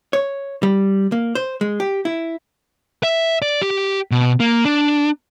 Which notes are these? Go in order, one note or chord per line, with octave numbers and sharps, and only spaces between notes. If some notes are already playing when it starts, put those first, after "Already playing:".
C#5
G3
A#3
C5
G#3
G4
E4
E5
D5
G4
B2
A#3
D4